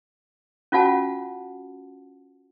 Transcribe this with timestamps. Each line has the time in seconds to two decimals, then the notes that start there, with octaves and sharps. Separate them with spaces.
0.72 C#4 F4 F#4 F#5 A5